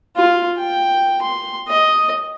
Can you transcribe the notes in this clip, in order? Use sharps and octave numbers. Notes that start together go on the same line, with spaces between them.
F4
G5
C6
D#5